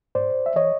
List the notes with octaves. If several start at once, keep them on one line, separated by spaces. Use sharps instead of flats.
G#2 C5 D5
E5
E3 C#5 D#5